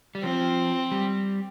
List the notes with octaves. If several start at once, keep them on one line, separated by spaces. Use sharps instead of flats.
G3
F3 C4
G3